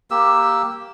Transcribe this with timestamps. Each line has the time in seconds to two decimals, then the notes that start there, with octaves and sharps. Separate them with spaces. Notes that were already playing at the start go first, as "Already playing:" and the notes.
0.11 A#3 G4 E6